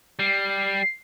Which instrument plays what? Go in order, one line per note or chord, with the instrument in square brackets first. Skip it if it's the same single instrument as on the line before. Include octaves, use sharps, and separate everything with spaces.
[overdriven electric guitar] G3 [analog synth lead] C7